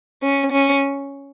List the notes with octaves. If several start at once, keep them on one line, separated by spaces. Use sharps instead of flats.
C#4
C#4